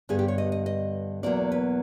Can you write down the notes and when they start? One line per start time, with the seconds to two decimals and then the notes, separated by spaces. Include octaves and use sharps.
0.09 G2 D3 G3 B3 G#4
0.19 G4
0.28 C#5
0.38 D#5
0.52 D#5
0.66 D#5
1.23 E2 B2 F#3 A#3 D5
1.52 B4